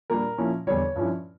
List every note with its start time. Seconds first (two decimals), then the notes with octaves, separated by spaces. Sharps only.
0.10 A#2 G3 D4 A#4
0.38 A#2 F3 C#4 E4
0.67 E2 D3 G3 C#5
0.95 G2 F3 C#4 E4